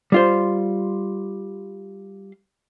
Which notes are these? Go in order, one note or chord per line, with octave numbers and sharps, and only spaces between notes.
G3 F4 C5